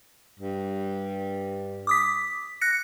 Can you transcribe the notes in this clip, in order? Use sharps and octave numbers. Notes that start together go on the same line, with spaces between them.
G2
D6 D#6 B6
F#6 A#6 C#7